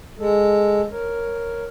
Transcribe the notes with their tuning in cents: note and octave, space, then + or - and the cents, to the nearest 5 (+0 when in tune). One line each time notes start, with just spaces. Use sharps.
G#3 -5 A4 -5
A#4 +0 C#5 +0